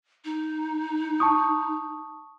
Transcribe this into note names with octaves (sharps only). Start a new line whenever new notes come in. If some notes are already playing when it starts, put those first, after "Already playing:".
D#4
A5 C#6 D#6